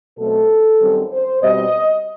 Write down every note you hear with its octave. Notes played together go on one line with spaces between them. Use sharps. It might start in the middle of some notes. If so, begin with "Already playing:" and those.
B2 F#3 A3 C4 A4
F#2 D#3 G3 C4
C5
B2 G3 C4 D#5